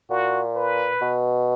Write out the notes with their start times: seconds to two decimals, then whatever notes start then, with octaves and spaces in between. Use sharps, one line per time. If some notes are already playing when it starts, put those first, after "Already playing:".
0.10 A#2 F#4
0.56 B4
1.01 B2